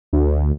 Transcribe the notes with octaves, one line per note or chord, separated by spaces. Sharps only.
D2